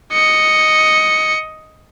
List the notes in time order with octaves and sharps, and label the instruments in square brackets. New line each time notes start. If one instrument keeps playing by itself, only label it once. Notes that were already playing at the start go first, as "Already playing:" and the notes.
[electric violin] D#5 C#7